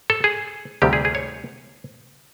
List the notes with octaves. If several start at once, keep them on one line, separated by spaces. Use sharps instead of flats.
A4
G#4
D2 C3 D#3 G3 G4
G#4
G#4
C#5